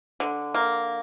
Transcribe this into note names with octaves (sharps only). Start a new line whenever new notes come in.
D3
A#3